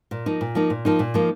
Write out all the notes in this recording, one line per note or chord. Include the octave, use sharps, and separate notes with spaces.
A#2
F3 A#3 D#4
A#2
F3 A#3 D#4
A#2
F3 A#3 D#4
A#2
F3 A#3 D#4